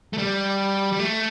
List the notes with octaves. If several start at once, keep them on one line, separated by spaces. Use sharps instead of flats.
A3
G3
G3
A3